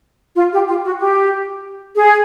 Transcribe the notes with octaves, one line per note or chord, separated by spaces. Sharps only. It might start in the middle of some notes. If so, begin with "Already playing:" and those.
F4
G4
F4
F#4
G4
G#4